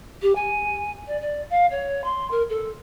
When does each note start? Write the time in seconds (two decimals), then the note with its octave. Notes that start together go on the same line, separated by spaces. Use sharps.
0.22 G4
0.35 G#5
1.07 D5
1.21 D5
1.50 F5
1.71 C#5
2.04 C6
2.31 A#4
2.50 A4